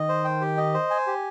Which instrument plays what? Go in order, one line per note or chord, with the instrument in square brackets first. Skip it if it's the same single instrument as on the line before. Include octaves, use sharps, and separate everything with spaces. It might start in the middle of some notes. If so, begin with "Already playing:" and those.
Already playing: [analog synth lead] D#3 [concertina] D#5
[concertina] C5
G5
G4
D#5
C5
G#5
G4